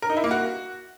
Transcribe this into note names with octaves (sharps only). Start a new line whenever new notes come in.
A#4
D#4
E4
A#3
F#4